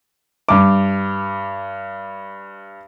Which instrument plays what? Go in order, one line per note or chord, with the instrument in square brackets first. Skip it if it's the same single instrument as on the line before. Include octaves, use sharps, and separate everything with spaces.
[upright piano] G2 D6